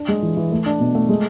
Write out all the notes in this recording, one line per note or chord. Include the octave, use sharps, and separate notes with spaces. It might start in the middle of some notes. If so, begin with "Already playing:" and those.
Already playing: D4
G#3
E3
E3
A3
D4
B2
A3
G#3